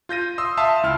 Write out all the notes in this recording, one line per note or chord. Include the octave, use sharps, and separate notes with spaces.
F4 G6 A#6 D#7
C6 D#6 E6
E5 F5 A5 C6 D#6
C#2 E4 F6